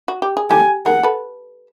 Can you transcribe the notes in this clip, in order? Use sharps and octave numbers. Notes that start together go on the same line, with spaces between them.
F#4
G4
G#4
G4 A4 G#5
G#4 A#4 F#5
A4 B4